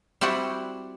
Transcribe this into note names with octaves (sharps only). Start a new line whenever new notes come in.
G3 C4 E4 F#4